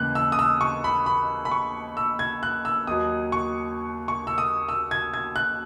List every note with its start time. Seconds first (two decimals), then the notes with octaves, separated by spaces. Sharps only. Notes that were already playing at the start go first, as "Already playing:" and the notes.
Already playing: D#2 C#3 E3 G#3 F#6
0.15 E6
0.32 D#6
0.39 E6
0.61 C#6
0.84 B5
1.06 B5
1.45 B5
1.51 C#6
1.97 E6
2.19 G#6
2.43 F#6
2.65 E6
2.87 D#2 D#3 F#3 D#6
3.32 C#6
4.08 C#6
4.27 E6
4.38 D#6
4.69 E6
4.91 G#6
5.14 G#6
5.36 F#6